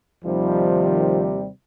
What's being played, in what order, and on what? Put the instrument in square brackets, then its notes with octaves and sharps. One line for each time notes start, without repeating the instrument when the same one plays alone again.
[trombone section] D#2 C3 G3 [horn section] D#3 F3